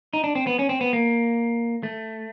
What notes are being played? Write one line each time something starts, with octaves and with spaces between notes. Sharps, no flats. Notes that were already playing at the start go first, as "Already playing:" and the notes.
D#4
D4
C4
B3
C#4
C4
B3
A#3
A3